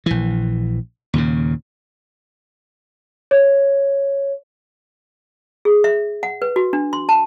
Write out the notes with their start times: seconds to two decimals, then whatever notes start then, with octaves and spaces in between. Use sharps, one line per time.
0.06 A#1 E3
1.14 D#2 A#2 C#3
3.31 C#5
5.65 G#4
5.84 E5
6.23 F#5
6.42 B4
6.56 F#4
6.73 D4
6.93 C6
7.09 A5